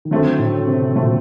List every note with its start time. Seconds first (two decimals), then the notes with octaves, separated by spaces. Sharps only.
0.05 D#3
0.11 D3 F#3 A3 C4
0.39 A2
0.67 C3
0.95 A#2 F#3 A3 C4